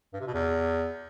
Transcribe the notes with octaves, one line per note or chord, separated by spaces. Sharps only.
G2
C3
B2
E2